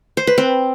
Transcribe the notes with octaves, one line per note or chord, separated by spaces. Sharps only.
C5
B4
C4